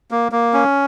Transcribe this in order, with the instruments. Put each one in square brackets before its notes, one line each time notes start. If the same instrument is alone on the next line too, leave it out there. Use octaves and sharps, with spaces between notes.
[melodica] A#3
A#3
C#4